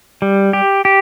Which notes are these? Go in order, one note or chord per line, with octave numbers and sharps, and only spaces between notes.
G3
G4
G4